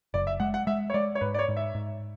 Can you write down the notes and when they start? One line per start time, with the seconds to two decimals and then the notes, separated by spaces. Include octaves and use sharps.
0.14 F#1 D5
0.27 E5
0.40 G#3 F#5
0.54 F#5
0.67 G#3 E5
0.90 C#5
0.94 G#3 D5
1.15 C#5
1.21 G#2 B4
1.34 D5
1.39 C#5
1.48 G#2
1.57 E5
1.75 G#2